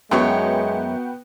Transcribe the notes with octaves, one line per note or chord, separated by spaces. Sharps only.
F#2 G#3 B3 F#4 C#5 E5 G5